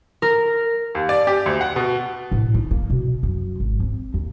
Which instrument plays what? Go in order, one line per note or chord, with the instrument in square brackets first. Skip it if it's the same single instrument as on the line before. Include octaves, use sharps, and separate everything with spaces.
[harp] A#4
[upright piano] D#2
D5
G4
D2
F#5
B2
[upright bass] A2
D#4
A#3
B2
F#2
G#1
C4
D#2